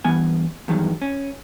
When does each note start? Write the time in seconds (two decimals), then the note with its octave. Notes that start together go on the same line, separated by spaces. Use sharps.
0.05 G2 E3 B3 G#5
0.68 E2 G2 D#3 F#3
1.02 C#4